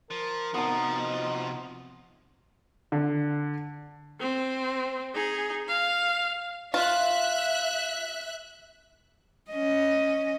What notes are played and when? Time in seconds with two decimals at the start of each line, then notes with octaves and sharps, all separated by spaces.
0.11 F3 A#4
0.54 C3 F3 B3 D#4 F#4 A#5
0.98 D#5
2.92 D3
4.20 C4
5.14 D#4 G#4
5.68 F5
6.74 F4 E5 F#6
9.51 C#4 D#5